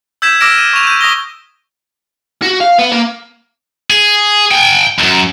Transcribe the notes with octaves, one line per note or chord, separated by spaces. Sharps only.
E6 G6 G#6 B6 E7
D6 E6 F6 A#6 D7 E7
D#7
C#6 F7
G6 D#7
C#6 D#6 A#6 G7
F#4
F5
B3
A#3
G#4
G5 G#5
C#2 F#2